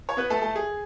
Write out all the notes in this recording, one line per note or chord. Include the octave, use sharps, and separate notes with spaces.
C#5
B3 B4
A3 A4
A3 A4
G#4